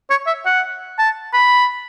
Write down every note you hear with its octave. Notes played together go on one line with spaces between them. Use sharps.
C#5
E5
F#5
A5
B5